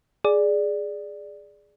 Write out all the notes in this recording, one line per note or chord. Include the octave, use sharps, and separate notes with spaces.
G#4 D5